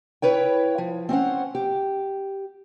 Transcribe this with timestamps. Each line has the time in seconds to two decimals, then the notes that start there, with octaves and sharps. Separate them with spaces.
0.22 E4 B4 C#5 G5
0.78 F3
1.09 C4 C#4 C5 F#5
1.55 G4